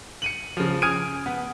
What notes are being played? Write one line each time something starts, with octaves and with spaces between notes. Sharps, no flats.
C#7 D#7 F#7
C#3 F3
G#5 D#6 F6 G#6 D7 D#7
B3